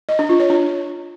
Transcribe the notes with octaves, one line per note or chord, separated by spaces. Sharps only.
D#5
D4
F4
C#5
D4